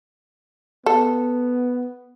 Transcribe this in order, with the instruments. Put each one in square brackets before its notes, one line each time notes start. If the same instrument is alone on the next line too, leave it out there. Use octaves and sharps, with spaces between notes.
[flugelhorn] B3 [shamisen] A4